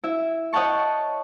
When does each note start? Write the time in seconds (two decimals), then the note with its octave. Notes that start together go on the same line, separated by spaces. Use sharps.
0.04 E4 E5
0.53 C#5 D#5 F#5 G5 A5 C#6